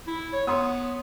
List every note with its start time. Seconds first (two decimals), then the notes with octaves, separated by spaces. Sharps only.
0.08 E4
0.33 C#5
0.47 B3 C#5 C6 D#6